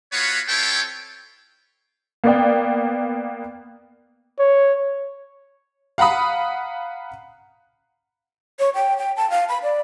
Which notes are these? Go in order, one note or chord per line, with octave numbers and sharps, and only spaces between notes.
B3 F4 F#4 B4 C#5
C4 E4 F4 A4 C#5 G5
A#3 B3 D5 G5
C#5
F5 F#5 A#5 B5 D#6
C#5
G5
G5
A5
F5
B5
D5